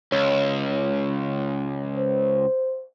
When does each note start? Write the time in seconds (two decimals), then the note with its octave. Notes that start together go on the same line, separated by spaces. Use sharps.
0.12 C#2 C#5
1.97 C5